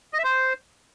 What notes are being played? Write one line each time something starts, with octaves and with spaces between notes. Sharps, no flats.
D#5
E5
C5